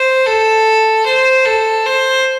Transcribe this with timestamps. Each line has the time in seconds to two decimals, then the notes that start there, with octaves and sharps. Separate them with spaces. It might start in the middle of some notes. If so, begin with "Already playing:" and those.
Already playing: C5
0.26 A4
1.06 C5
1.45 A4
1.86 C5